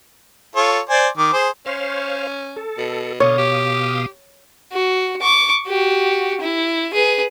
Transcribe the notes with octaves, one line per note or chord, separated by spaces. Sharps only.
F4 A4 C#5
C5 D5 G#5
D#3 D6
G#4 C5
C#4 C5 C#5 F5
A4
B2
B2 D3 C#5 F5 D#6
G4
F#4
C#6 D6
F#4 G4
E4
G#4 B4